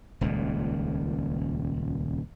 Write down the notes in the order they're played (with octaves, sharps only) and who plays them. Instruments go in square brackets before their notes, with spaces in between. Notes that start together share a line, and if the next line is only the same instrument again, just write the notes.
[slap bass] D#1 C#2 A#2